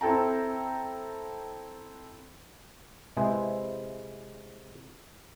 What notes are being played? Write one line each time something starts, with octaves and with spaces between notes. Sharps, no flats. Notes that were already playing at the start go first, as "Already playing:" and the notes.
C4 E4 A4 G5 A#5
C3 G#3 E4 G#4 B4 C5